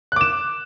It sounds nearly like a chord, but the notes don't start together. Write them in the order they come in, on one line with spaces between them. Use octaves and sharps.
F#6 D6 E7